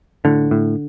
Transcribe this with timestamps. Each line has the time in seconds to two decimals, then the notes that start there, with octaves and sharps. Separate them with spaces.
0.25 A2 D3
0.51 A2